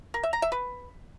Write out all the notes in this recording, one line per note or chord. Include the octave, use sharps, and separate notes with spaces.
A#4
E5
A#5
E5
B4